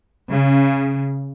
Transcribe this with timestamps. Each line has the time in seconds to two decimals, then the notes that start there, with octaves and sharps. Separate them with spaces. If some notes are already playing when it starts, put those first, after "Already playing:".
0.32 C#3